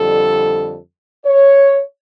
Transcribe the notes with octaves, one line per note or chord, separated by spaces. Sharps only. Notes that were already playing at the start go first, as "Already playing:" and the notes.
Already playing: F2 D3 G3 A4
C#5